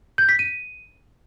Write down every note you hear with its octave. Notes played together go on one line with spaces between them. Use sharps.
G6
B6
D#7